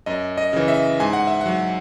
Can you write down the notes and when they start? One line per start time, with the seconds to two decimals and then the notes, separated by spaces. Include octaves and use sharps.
0.06 F#2 D#5
0.38 D#5
0.53 C#3 E3
0.68 E5
1.00 G#2 G#5
1.13 F#5
1.27 E5
1.41 F#3 F#5